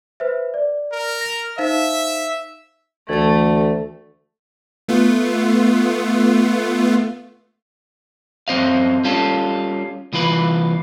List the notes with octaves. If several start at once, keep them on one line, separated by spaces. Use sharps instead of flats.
B4 C5 E5
D5
A#4
A#6 F7
D#4 C5 E5 F5
D2 E3 A3 A4
A3 B3 F4
F#2 C4 C5 D#5 F5
G3 C#4 F4 A4
C2 E3 F4 B4